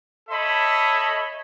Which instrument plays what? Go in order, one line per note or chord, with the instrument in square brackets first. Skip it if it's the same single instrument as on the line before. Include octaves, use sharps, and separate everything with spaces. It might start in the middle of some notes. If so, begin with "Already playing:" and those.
[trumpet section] A4 C#5 D#5 E5 B5